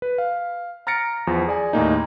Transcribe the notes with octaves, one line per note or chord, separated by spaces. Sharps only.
B4
F5
A#5 F6 A6 A#6 C#7 D7
E2 F3
G#4 D5 G#5
D#2 A2 A#3 D#4